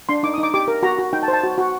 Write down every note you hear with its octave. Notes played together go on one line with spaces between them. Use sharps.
D4 C6
D#4 D6
D#6
D#4
D6
G4 D6
A#4
F#4 A#5
F#4
D#4 G5
A5
C5
A5
F#4
F#4